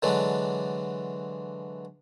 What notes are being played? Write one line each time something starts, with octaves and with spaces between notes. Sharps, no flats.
D3 E3 F#3 G#3 D4